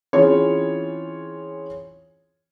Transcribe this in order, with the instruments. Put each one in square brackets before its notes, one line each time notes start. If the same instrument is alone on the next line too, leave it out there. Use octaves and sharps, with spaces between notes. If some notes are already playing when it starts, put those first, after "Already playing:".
[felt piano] E3 C4 C#4 F4 G#4 C#5